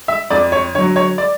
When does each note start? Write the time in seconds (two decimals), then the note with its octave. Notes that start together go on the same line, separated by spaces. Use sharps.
0.08 E5
0.30 F2 D5
0.52 C#5
0.74 D3 C#5
0.78 F#3
0.96 C#5
1.18 D5